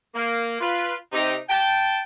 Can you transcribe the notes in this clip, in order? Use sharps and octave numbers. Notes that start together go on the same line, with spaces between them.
A#3
F4 B4
C3 D#4 G4
G5 A5